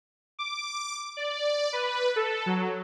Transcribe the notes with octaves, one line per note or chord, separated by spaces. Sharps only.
D6
D5
B4
A4
F#3